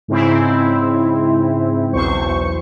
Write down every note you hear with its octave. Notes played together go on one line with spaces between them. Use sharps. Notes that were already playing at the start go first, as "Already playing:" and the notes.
G#2 C#3 C4 E4
B1 E2 C5 C#6